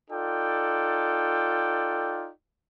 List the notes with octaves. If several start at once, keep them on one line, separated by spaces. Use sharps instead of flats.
D#4 F4 A4 D5 G5